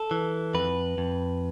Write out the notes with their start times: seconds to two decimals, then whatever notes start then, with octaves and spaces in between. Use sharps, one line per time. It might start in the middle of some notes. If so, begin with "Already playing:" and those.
Already playing: A4
0.11 E3
0.54 F2 B4
0.98 F2